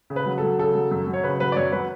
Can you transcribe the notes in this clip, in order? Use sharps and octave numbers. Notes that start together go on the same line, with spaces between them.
C#3
B4
F#3
F#3 A4
C#3 A4
F#3
F#2
F#3
C#5
C#3 B4
F#3 B4
D5
F#2 C#5
F#3 B4